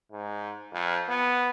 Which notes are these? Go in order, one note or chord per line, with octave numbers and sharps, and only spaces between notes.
G#2
F2
B3